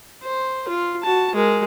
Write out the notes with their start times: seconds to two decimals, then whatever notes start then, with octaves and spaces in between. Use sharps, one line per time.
0.22 C5
0.68 F4
1.03 F#4 A5
1.35 G#3 A#4